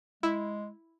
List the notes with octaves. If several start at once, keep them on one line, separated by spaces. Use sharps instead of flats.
G#3 E4